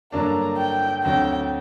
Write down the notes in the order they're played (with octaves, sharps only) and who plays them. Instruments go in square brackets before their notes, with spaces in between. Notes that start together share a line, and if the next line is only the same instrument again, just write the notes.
[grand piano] G2 D3 F#3 A#3 D4 [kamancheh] A#5
[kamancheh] G5
[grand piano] D2 D3 F#3 C4 [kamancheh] G5